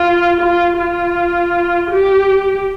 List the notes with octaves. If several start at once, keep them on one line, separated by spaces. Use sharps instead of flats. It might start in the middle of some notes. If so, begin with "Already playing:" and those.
Already playing: F4
F4
F4
G4